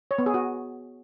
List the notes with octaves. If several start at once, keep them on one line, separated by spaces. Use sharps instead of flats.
C#5
B3
G#4
F#4